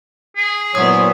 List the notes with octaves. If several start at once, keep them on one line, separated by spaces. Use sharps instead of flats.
G#4
A#2 F#3 B3 E4 C5 C#5 D#6